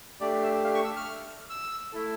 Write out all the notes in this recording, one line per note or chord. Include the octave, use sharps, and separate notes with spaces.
A3 D4 G4 D5
E5
F5
C#6
E6
F6
E6
A3 E4 A4